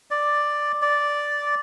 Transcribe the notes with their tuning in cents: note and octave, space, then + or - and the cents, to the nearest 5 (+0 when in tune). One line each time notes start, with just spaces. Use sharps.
D5 +5
D5 -5